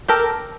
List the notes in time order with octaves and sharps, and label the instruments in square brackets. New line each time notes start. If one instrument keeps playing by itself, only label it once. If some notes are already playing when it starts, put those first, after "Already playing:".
[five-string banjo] G4 A4 [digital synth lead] A#4